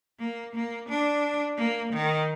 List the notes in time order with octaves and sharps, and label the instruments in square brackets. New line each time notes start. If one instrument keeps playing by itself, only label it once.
[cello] A#3
A#3
D4
A#3
D#3